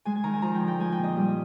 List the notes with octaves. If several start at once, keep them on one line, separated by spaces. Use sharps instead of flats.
G#3 G#5
G#5
D#3 A#5
G#5
F3 A#5
G5
D3
G5
G#3 G#5
G5
A#2
D#5
G3